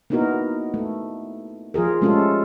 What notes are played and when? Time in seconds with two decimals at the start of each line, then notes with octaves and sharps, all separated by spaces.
0.10 A#3 B3 D#4 E4 F#4 A#4
0.74 A3
1.74 F3 F4 G#4 A#4
2.01 G#3 A3 C#4 F4 G4 A4